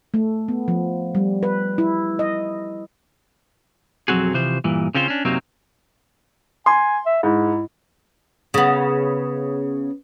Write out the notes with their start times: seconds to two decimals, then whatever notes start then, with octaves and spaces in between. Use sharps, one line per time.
0.14 A3
0.48 B3
0.68 F3
1.15 G3
1.43 B4
1.78 E4
2.19 D#5
4.08 B1 F2 F#3 C4 F#4 G#4
4.34 C3 E3 F3 C5
4.64 G2 A#2 E3
4.95 C#3 C4 C#4 F4 G#4 C5
5.08 C#4 D4
5.25 F#2 C3 F#3 A#3 C4 D#4
6.66 G#5 C6
7.06 E5
7.23 G#2 E4
8.54 C#3 B3